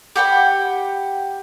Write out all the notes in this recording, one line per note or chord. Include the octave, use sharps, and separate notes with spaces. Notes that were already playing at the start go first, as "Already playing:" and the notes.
G4 F#5 G5 B5